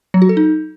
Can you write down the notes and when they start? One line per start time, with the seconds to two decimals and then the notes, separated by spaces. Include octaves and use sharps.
0.14 F#3
0.22 F#4
0.29 A4
0.37 D#4